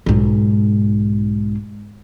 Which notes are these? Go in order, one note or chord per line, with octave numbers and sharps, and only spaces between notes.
B1 G#2